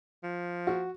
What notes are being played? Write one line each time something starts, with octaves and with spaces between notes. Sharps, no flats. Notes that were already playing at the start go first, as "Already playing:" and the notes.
F3
F#4